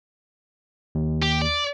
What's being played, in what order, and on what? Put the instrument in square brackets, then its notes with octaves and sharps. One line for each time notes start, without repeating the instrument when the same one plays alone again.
[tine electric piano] D#2
[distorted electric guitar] G4
D5